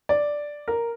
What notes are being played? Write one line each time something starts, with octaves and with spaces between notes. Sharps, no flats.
D5
A#4